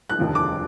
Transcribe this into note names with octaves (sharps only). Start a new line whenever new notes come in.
F#6
F1 D#2 D3 F3
D6